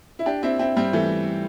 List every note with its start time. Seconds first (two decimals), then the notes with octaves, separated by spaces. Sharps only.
0.19 E4
0.26 D4 G4
0.43 C4 E4
0.59 C4 E4
0.77 G3 C4
0.93 E3 A3